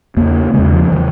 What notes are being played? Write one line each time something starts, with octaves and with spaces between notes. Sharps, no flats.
E2 C#3 A#3
E2 C#3 G#3
F3
C#3 E3